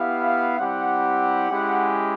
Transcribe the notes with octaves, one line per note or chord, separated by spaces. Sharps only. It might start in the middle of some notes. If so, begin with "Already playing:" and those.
Already playing: B3 E4 G4 F5
G3 C4 E4 G4 F#5
G#3 C#4 E4 G4